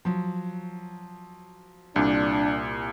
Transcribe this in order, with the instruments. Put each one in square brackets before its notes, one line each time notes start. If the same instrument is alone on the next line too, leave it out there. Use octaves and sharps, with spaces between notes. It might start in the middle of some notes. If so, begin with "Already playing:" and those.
[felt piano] F3 F#3
[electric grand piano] C2 A#2 [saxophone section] D4